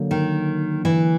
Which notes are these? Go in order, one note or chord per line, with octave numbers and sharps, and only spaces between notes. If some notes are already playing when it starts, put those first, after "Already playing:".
Already playing: D3 F#3 A#3
D#3
E3